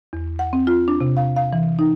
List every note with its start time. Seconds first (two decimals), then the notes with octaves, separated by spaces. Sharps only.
0.13 E2
0.39 F#5
0.53 C4
0.67 F4
0.88 D4
1.00 C3
1.17 F5
1.36 F5
1.53 E3
1.79 D#4